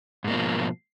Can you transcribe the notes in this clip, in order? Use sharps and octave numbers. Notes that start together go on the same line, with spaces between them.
G#2 B2 F3 A#3